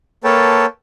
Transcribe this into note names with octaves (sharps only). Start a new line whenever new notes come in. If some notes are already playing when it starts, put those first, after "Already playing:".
A#3 A4 B4 C#5 G5 A5